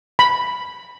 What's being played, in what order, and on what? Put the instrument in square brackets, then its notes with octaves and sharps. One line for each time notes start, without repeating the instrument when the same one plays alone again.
[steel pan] B5